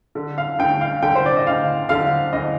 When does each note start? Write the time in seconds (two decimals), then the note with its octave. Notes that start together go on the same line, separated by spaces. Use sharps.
0.15 D3
0.38 F5
0.59 D2 G5
0.81 F5
1.02 D3 G5
1.15 C5
1.26 D5
1.36 D#5
1.47 D2 F5
1.89 D3 F5
2.33 D2 D#5